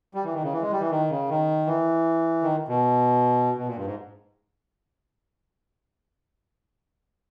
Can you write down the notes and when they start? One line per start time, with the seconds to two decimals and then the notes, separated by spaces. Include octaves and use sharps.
0.14 G3
0.24 E3
0.33 D#3
0.43 C#3
0.53 E3
0.62 G#3
0.72 G3
0.80 E3
0.90 D#3
1.10 C#3
1.29 D#3
1.67 E3
2.43 D#3
2.68 B2
3.57 B2
3.67 A#2
3.76 G2
3.85 G#2